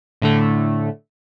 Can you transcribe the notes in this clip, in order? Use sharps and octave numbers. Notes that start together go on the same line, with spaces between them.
A2 D3 A3